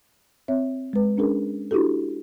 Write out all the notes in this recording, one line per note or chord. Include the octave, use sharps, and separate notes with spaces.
C4 C#5 E5
G#3 B4
C#4 D4 G#4 A#4
D4 E4 F#4 G4 A4